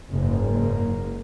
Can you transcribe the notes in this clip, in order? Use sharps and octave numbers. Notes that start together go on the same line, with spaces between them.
F#1 G#2 A#3